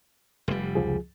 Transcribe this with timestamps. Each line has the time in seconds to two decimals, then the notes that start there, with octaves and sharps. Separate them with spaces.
0.48 F1 G3
0.75 C#2 F3 G#4